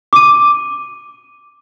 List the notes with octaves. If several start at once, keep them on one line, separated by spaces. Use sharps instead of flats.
D6 D#7